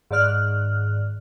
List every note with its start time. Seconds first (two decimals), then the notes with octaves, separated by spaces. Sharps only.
0.11 G#2 D#3 D5 F6 F#6